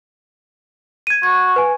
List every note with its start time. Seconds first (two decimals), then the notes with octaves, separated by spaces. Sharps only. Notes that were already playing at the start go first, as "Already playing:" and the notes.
1.07 G#6 D#7
1.23 F#4 G#6
1.56 B4 G#5